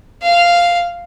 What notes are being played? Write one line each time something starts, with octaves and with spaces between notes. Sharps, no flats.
F5